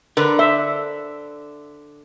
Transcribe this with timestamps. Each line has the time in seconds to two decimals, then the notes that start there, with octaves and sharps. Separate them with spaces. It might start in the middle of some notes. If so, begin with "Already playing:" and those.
0.17 D3 A#4 B4
0.39 C5 E5